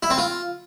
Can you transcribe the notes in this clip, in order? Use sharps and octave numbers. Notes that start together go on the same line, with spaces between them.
E4
C4
F4